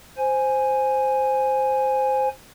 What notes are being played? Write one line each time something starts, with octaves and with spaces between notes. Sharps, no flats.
C5 G#5